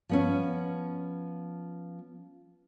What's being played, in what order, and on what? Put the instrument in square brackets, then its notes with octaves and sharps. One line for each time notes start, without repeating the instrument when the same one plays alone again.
[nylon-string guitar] F3 B3 C#4